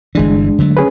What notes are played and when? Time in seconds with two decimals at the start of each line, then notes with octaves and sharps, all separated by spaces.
0.15 G1 E3 G#3 D4
0.58 D3 F#3 A3
0.77 C#4 G#4 B4